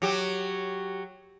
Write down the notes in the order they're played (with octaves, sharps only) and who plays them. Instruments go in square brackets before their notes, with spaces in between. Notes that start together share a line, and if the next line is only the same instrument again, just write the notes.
[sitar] F#3 G4